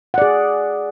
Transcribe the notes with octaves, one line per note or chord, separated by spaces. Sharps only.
G#4 D5 F#5